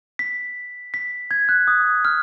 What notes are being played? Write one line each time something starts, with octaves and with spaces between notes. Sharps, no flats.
B6
B6
G#6
F#6
D#6
F6